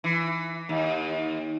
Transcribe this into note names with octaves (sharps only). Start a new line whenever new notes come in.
E3
D#2